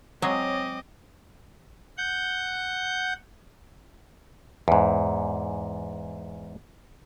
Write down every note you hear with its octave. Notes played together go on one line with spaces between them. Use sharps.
F#3 G#3 C4 C#5 D#5 D6
F#5 G6
E2 G#2